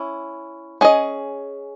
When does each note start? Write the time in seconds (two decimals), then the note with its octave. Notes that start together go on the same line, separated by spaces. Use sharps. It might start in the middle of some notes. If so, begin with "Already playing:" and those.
Already playing: C#4 E4
0.81 C#4 G#4 D#5